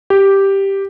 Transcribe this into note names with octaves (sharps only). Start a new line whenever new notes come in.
G4